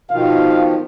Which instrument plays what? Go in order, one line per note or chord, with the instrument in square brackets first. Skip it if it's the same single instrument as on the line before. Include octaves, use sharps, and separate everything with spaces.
[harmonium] B2 D#3 F3 [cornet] F5